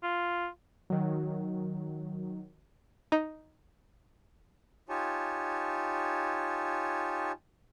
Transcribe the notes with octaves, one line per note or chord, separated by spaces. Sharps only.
F4
D#3 F#3
D#4
D#4 F4 G4 C#5 G#5 A5